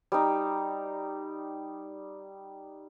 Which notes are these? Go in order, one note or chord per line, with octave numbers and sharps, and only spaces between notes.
G3 D#4